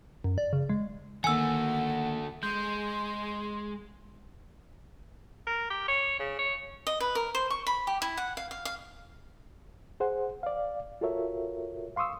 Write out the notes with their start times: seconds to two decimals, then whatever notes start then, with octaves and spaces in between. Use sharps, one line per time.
0.24 F#2
0.38 D5
0.53 C#3
0.69 G#3
1.24 D3 D#3 A3 A#3 F#5 G#5 E6
2.43 G#3 C6 G6
5.47 A#4
5.70 G4
5.88 C#5
6.20 C#3
6.39 C#5
6.87 D#5
7.00 B4
7.15 A#4
7.35 C5
7.50 C#6
7.67 B5
7.87 G4
8.02 E4
8.17 F#5
8.37 F5
8.51 F5
8.65 F5
10.00 G#4 C5 F#5
10.43 D5 F5
11.01 F4 F#4 A4 A#4 C#5 E5
11.96 F5 C6 C#6 D#6 E6